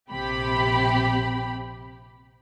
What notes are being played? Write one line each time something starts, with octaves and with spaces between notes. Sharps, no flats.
A#1 C3 G4 B5